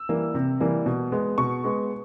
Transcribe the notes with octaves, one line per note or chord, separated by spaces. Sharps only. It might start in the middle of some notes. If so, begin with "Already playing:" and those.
Already playing: E6
E3 G3 A#3
C3
E3 G3 A#3
B2
G#3 B3
B2 C#6
G#3 B3